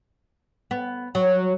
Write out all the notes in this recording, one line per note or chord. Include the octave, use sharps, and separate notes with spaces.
B3
F#3